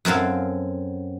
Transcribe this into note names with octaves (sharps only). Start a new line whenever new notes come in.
F#2 F#3 C4 A4 F5